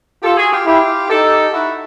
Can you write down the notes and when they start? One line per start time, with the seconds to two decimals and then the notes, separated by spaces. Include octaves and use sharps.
0.23 F4 G4 A4
0.37 F#4 G#4
0.52 F4 G4
0.66 E4 F4 G4
1.09 D#4 G4 A4
1.52 E4 F#4